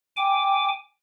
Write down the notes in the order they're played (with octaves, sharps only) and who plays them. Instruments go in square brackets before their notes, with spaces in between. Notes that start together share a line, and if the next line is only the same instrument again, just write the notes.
[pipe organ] G5 G#5 D6